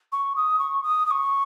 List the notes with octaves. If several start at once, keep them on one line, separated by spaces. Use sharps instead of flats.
C#6
D#6
C#6
D#6
D#6
C#6